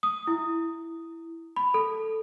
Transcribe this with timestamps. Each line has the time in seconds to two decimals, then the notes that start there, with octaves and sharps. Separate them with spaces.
0.03 D#6
0.27 E4
1.56 B5
1.74 A4